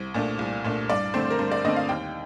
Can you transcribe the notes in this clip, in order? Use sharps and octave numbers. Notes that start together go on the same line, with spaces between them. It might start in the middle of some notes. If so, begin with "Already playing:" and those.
Already playing: C2
A#2 A3 D4
C2
A#2 A3 D4
G2 D5
D3 A3 C4 C5
A#4
G2 C5
D5
D3 A3 C4 D#5
F5
D#2 G5